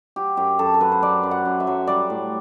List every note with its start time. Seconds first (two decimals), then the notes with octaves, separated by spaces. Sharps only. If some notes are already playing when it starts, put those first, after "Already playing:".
0.16 F#3 G4
0.37 F#2 G4
0.59 F#2 A4
0.74 A4
0.80 F#3 B4
0.92 C5
1.02 F#3 D5
1.23 F#2
1.31 F#5
1.45 F#2
1.60 E5
1.67 F#3
1.87 G3 D5
2.10 A2